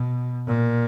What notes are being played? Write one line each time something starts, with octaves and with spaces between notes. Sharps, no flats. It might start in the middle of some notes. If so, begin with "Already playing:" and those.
Already playing: B2
A#2